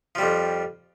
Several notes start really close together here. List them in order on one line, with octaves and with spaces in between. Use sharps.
F3 G3 F2